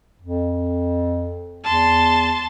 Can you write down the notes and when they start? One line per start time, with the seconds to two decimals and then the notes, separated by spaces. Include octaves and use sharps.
0.22 F2
1.65 E2 A5 C6